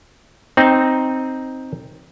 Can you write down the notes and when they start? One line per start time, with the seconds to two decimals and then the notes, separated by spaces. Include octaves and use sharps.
0.57 C4 D#4